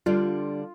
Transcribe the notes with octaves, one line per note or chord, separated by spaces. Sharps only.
D3 G3 D4 F4